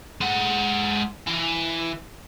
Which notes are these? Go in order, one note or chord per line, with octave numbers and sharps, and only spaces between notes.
G#3 F#5
E3